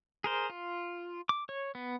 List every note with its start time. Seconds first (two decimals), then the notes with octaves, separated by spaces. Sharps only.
0.24 G#4 A#4 C5
0.50 F4
1.29 D6
1.49 C#5
1.75 B3